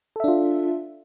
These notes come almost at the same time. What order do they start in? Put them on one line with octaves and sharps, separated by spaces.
A4 E5 D4 F4